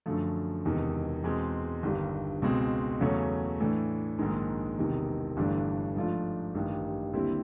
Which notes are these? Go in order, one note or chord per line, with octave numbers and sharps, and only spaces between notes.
F#2 D3 F3 A3
E1 E2 C3 D#3
E2 B2 G#3 C4
G1 G2 D#3 G3
C#2 B2 G#3 C4
E2 C#3 F#3 A3 C#4
A2 E3 A3 D4
A#1 G#2 D#3 G#3
E1 E2 C3 D#3
G1 G2 E3 A3 D4
G#2 F3 A3 D4 F4
A1 G2 D#3 G3
D#2 D3 G3 C4 E4